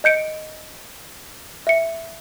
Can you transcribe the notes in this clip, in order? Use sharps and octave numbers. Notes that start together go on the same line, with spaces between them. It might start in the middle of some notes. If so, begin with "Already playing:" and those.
D#5 G6 C#7 D7
E5 C#7